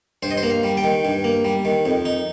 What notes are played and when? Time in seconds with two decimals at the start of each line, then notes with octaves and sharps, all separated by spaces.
0.23 G2 C5
0.31 D#5
0.37 C5
0.43 A#3
0.50 F5
0.64 G3
0.77 G5
0.84 D#3
1.05 G2
1.24 A#3
1.44 G3
1.65 D#3
1.85 F2
2.05 D#4